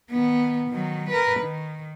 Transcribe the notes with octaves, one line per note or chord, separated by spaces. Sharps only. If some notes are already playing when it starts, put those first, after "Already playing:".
D#3 B3
D#3 F#3
A#4 B4
D#3